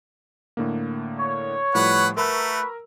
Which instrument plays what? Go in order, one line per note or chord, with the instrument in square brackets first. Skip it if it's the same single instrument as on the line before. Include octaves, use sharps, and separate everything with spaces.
[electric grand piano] A2 D3 A#3
[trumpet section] C#5
[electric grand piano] A2 F3 G3 [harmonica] B4 F#5
[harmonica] A3 [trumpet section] F#4 B4 [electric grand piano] A#4 A#5 E6